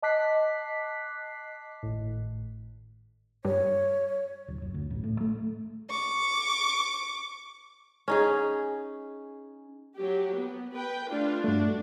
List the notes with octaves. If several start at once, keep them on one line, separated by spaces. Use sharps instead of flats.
D#5 A5 D6 F#6 B6 C7
G#1 A2
G2 C#5
D1
F#1
D2
A1
A2
A3
C#6 D6
C#4 D#4 G#4
F#3 G4
B3
B4 G5
A3 D4 F4
G2 A3 D4 F#4